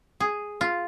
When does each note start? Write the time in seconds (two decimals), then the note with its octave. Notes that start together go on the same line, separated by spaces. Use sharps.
0.20 G#4
0.61 F4